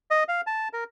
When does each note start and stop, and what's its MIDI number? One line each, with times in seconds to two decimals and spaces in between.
0.11 0.24 75
0.28 0.41 77
0.47 0.68 81
0.73 0.84 70